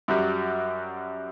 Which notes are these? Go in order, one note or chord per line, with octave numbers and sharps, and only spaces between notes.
F#2 F#3 G3